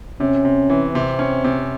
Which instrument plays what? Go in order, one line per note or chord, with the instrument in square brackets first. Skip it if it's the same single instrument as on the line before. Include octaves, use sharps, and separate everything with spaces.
[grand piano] C3 [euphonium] C#4
[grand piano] C3
E3
[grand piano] C3 [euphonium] C4
[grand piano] C#4
C3